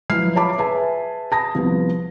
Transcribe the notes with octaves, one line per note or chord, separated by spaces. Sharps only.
F3 F#3 E4 B4 F6 C7
F4 C#5 E5 A5 B5 D6
G#4 B4 E5 G#5 A5
A5 B5 D#6 A#6
C2 F3 B3